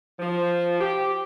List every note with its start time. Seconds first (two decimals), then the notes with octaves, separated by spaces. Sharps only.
0.19 F3
0.81 G4